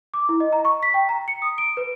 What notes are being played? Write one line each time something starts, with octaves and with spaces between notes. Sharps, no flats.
D6
E4
D#5
A#5
C#6
B6
G5
A#5
C#7
D#6
D7
B4